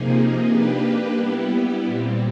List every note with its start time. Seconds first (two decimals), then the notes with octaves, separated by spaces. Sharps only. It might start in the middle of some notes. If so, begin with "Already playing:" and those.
Already playing: C3 F3 A#3 D#4 G#4
0.44 A#3 D4 G4 B4
1.15 G3 B3 E4 G4
1.85 A#2 G3 C4